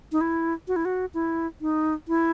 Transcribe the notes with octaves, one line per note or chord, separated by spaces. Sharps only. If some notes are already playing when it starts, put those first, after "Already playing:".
D#4
E4
F#4
E4
F#4
E4
D#4
E4